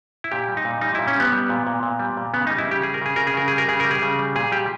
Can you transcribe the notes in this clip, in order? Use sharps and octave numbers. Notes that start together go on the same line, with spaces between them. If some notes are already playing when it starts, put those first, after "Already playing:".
E4
A#2 G4
G3
D#4
A#2
G3 D#4
A#2 E4
C#4
G3 B3
G3
A#2
A#2
A#2
G3
A#2
C#3 B3
G3 D#4
E4
C#3 G4
G3 G#4
A#4
C#3 G#4
C#3 A#4
G#4
C#3 A#4
G3 G#4
A#4
C#3 G#4
G3 A#4
G#4
C#3
G3
A#2 G#4
G3 G4